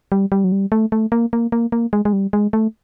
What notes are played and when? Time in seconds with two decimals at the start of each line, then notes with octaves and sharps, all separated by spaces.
0.12 G3
0.32 G3
0.44 F#3
0.52 G3
0.72 A3
0.92 A3
1.12 A#3
1.33 A#3
1.52 A#3
1.72 A#3
1.93 G#3
2.05 G#3
2.13 G3
2.33 G#3
2.53 A3